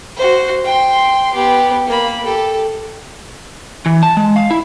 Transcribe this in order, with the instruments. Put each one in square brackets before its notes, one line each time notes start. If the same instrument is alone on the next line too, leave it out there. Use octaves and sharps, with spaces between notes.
[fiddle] F#4 C5
G5 C6
B3 G4
A#3 B5
G4 A4
[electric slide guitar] E3
A5
G#3
F5
E4